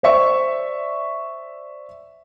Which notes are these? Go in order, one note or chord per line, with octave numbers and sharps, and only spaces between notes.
C5 D5 E5 C#6